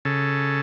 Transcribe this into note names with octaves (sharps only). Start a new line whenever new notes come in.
C#3 A4